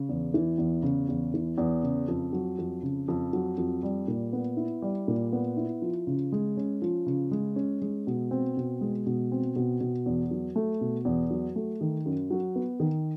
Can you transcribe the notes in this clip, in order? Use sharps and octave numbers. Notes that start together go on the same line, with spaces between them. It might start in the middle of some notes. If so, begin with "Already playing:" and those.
Already playing: C#3
E2
E3
E2
C#3
E2
E3
E2
C#3
F2
F#3
F2
C#3
F2
F#3
F2
G3
A#2
B3
E4
G3
A#2
B3
E4
F3
C#3
G#3
C#4
F3
C#3
G#3
C#4
G#3
B2
C4
B2
G#3
B2
C4
B2
B2
E2
F#3
A3
B2
E2
F#3
A3
D#3
F#2
F#3
B3
D#3